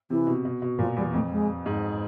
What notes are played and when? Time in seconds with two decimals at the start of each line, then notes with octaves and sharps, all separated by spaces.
0.10 C3 E3
0.27 B2
0.45 B2
0.62 B2
0.79 A#2 F3
0.96 E2 G3
1.14 F2 A3
1.32 G#3
1.66 G#2